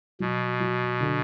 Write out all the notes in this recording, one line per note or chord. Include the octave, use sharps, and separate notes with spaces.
B2 F#3
F#3
D3